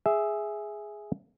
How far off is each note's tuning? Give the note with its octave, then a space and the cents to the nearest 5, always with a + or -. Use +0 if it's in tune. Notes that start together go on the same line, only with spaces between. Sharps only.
G#4 +0 E5 +0